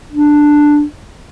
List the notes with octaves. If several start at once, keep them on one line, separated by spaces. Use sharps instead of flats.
D4